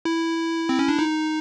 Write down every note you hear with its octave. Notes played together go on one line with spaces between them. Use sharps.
E4
C4
C#4
D4
D#4